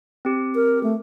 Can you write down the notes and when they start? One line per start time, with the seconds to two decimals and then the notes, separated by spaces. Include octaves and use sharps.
0.25 C4 G4
0.55 A#4
0.83 A3